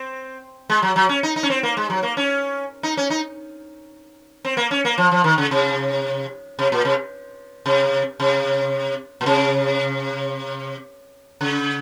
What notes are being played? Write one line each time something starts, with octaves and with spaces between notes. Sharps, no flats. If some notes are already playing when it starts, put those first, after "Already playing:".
Already playing: C4
G#3
F#3
F#3
C#4
D#4
D#4
C#4
C4
A#3
G#3
F#3
A#3
C#4
D#4
C#4
D#4
C4
A#3
C#4
A#3
F3
F3
D#3
C#3
C3
C3
A#2
C3
C3
C3
A#2
C3
C#3